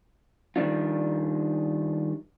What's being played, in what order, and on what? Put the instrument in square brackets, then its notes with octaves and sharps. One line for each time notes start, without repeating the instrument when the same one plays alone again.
[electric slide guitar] D#3 G3 A#3 D4 F4